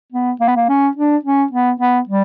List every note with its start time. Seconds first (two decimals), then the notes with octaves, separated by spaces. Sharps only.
0.12 B3
0.40 A#3
0.48 B3
0.56 A#3
0.69 C#4
0.97 D4
1.25 C#4
1.52 B3
1.80 B3
2.09 G3